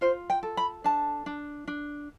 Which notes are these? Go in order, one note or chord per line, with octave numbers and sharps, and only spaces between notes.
F4 C5
G5
A4
B5
D4 A5
D4
D4